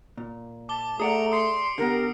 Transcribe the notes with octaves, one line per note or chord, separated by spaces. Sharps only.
A#2
A5 D6 G7
A3 G#4 D5 F#5 A#5 D#6 C#7 D7
C6 D#6 C7 C#7
D3 B3 G4 A#4